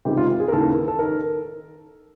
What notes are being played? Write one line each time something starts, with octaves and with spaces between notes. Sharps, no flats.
C#2 C3 D#3 G4
F4
G#4
A#4
D#2 C#3 E3 A4
A4
D#3 A#4